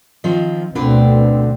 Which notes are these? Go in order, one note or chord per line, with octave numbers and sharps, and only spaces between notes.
D#3 F3 C4
D2 B2 D3 C4 B4 D5